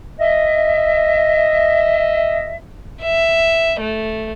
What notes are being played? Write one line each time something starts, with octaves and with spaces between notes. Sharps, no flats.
D#5 E5
E5
A3